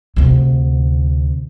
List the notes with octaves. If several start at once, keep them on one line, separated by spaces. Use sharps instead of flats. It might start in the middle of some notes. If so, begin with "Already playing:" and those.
D2 C3